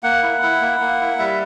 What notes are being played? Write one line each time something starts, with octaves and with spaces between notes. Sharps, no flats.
A#3 F#5
E4
E4
A#3
A#3
E4
G3 E5